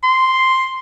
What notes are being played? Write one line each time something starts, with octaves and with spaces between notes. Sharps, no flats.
C6